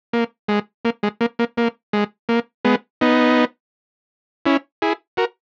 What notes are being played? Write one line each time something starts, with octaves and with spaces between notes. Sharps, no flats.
A#3
G#3
A#3
G#3
A#3
A#3
A#3
G#3
A#3
G#3 B3
B3 D#4
C#4 E4
E4 G#4
F#4 A#4